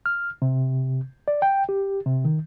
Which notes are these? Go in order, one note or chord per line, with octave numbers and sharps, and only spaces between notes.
F6
C3
D5
G5
G4
C3
D#3